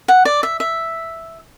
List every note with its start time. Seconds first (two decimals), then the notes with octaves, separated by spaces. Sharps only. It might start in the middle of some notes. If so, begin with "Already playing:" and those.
0.08 F#5
0.25 D5
0.43 E5
0.60 E5